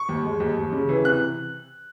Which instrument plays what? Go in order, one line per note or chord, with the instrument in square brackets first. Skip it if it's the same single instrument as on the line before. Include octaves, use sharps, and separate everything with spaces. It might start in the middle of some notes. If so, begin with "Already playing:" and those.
Already playing: [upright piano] C#6
D#2
G#3
D#2
D#2
C#3
E3
C3 F#6